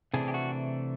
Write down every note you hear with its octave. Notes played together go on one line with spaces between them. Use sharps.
C3 E3 A3 D4 G#4
G4
F#4